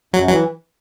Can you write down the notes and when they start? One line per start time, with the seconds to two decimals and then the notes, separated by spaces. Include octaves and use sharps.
0.14 F#2 F#3
0.29 E3 F#3